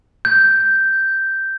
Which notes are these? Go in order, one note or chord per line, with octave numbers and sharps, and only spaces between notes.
G6